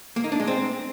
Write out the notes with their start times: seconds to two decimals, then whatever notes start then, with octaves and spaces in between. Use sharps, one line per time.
0.16 A#3
0.24 D#4
0.32 D4
0.40 G#3
0.47 C4